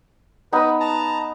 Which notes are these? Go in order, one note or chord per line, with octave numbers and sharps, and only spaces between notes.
B3 D#4 B4
A5 A#5